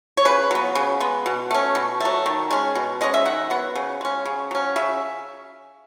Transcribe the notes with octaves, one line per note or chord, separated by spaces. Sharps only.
C#5
C#3 B4
F#3 B3
C#3
G#3 B3
B2
A3 C#4
B2
F#3 A3
D#3
G#3 C#4
B2
G#3 C#4 D#5
E5
D#3 F#5
F#3 B3 F#5
C#3
G#3 C#4
C#3
F#3 C#4
C#3 E5